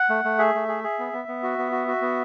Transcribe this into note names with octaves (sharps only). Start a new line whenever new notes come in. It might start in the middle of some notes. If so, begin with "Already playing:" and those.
Already playing: F#5
A3
A3
G#4 E5
A3
G#4
G#4
B3
B3
B3
F#4
B3
F#4
F#4
B3